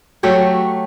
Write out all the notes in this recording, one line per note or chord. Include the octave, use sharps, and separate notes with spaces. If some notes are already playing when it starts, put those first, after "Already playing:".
F#3 A3 G4 C#5